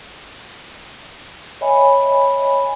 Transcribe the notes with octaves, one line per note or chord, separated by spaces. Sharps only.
C#5 D#5 E5 G#5 B5